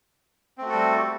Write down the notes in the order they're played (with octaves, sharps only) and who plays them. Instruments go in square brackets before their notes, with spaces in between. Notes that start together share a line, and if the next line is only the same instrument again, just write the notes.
[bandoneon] C4
A3
F#4
A4
G3